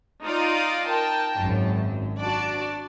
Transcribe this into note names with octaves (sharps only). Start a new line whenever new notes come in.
D#4 F4 D5 F5 A#5 D#6
A#4 G5 A5
G#1 F#2
D4 F#4 D5 A5